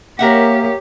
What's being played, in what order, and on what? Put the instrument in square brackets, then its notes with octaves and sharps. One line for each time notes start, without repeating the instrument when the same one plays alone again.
[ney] A#3 [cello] G4 C#5 [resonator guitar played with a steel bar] A#4 E5 F#5